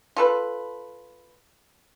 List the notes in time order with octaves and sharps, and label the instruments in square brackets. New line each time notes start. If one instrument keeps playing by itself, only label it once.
[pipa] F4 A4 B4